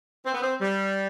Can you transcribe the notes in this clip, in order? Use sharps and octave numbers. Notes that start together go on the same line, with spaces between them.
C4
B3
C4
G3